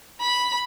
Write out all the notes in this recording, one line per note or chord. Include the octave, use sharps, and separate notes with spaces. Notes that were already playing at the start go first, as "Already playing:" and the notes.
B5